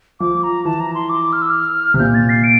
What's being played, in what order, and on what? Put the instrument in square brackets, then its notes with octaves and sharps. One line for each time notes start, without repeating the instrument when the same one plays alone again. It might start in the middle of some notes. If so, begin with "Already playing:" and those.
[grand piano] F3 [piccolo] D6
[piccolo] A#5
[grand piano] E3 [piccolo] A5
[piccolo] A#5
C6
D6
F6
E6
F6
[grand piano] C3
[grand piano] A#2 [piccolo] G6
[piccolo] A6
C7
D7